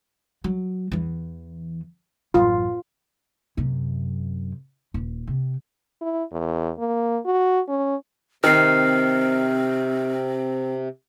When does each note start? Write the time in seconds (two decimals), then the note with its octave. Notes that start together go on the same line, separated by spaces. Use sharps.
0.44 F#3
0.92 E2 E3
2.34 A1 F#2 F4
3.57 F#2 C3
4.94 D#1
5.27 C3
6.01 E4
6.32 E2
6.79 A#3
7.25 F#4
7.68 C#4
8.44 C3 D#3 C4 F6 C7